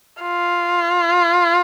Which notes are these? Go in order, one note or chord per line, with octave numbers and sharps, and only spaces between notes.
F4